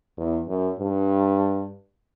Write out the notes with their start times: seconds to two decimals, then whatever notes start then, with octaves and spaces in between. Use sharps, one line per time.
0.17 E2
0.48 F#2
0.79 G2